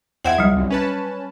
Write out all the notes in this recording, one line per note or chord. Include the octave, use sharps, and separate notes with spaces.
E2 C5 E5 F#5 G5 G#6
C#2 F#3 G3
C2 F#2
C#4 B4 A5